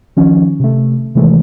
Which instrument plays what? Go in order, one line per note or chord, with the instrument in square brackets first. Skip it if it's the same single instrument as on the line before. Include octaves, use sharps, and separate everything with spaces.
[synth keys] D#3 F3 C#4
C3 A3
C3 D#3 E3 G#3 A3